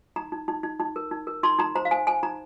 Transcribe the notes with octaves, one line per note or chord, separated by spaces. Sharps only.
D#4 A#5
D#4
D#4
D#4
D#4
A#4
D#4
A#4
D#4 C6
D#4 A#5
C5 A#5
F5
C5 G#5
C5 G#5
D#4 A#5